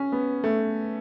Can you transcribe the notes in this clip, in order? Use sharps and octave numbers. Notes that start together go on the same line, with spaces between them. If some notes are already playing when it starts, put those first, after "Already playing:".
Already playing: C#4
B3
A3